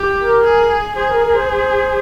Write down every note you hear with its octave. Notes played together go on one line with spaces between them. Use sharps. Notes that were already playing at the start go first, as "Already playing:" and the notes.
Already playing: G4
A#4
G#4
G#4 C5
A#4
A#4
C5
C5